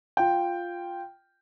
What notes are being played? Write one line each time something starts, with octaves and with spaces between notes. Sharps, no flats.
F4 G5